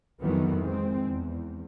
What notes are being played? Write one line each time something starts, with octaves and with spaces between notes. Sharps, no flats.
F2 D#3 E3 F#3 B3
G#3 C4
E2